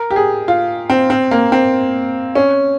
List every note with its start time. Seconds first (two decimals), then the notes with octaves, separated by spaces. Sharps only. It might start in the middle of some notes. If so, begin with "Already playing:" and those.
Already playing: A#4
0.11 G4
0.16 G#4
0.48 F4
0.90 C4
1.10 C4
1.31 A#3
1.52 C4
2.35 C#4